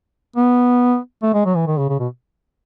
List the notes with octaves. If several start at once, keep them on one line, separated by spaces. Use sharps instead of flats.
B3
A3
G#3
F#3
E3
D#3
C#3
C#3
B2